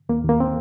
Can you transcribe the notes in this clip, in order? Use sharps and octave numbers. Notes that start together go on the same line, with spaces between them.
D#2 A#3
D#2 A#3
C4